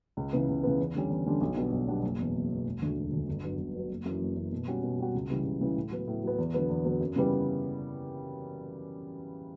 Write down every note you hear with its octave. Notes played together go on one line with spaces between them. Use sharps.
C#2
C#3 E3 B3
C#2
C#3 E3 B3
E2
D3 G3 C#4
E2
D3 G3 C#4
B1
B2 G3 D4 F#4
B1
B2 G3 D4 F#4
F#1
E2 B2
F#1
E2 B2
E1
D2 D3
E1
D2 D3
G1
G2 F#3 B3
G1
G2 F#3 B3
F#1
F#2 E3
F#1
F#2 E3
B2
G3 C#4 F#4
B2
G3 C#4 F#4
C#2
C#3 E3 G3
C#2
C#3 E3 G3
A2
F#3 B3
A2
F#3 B3
E2
D3 F#3 B3
E2
D3 F#3 B3
F#2
C#3 E3 G3 B3